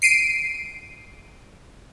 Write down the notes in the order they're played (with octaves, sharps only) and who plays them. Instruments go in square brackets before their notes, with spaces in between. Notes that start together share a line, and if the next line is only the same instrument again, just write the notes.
[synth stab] C7 D7 D#7